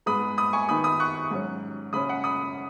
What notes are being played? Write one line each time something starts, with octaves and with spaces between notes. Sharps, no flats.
G#2 G#3 B3 B5 D#6
B5 D#6
G#5 C#6
D#3 B3 D#4 B5 D#6
B5 D#6
C#6 F#6
G#2 F#3 C#4
C#3 G#3 C#4 B5 D#6
F#5 B5
B5 D#6